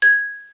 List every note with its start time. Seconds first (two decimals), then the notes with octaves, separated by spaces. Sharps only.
0.02 G#6